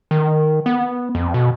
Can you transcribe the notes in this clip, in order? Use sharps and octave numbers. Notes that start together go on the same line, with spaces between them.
D#3
B3
F2
B2